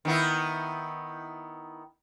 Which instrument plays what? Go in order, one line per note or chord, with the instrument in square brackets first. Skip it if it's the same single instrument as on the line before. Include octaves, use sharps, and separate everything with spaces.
[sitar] D#3 B3 E4